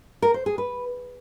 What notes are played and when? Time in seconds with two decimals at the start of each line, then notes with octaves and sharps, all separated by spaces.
0.22 A#4
0.34 C5
0.46 G#4
0.58 B4